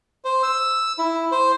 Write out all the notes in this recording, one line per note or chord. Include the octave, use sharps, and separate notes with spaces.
C5
E6
E4
C5